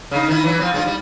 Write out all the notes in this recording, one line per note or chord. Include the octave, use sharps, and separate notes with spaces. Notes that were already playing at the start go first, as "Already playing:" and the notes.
C#3 D#4
D#3 E4
E3 F#3
F3 C4
G#3 C#4 F4
G3